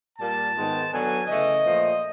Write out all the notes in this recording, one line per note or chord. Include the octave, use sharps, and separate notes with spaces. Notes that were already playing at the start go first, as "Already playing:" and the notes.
A#2 G3 A#3 A5
G#2 D#3 G#3 B3
D3 F#3 B3 G#5
C#3 E3 A3 D#5
A#2 F3 A3